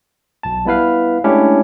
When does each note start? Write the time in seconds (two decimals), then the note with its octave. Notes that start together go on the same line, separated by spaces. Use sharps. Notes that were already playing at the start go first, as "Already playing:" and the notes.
0.43 B1 A5
0.65 G3 B3 E4 B4 F5
1.24 G#3 A3 C#4 D4 E4 G4